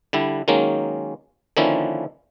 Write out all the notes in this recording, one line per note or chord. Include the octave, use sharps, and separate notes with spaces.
D3 G3 E4
D#3 F#3 G#3 A#3 C#4
D3 D#3 F3 A#3 C#4 E4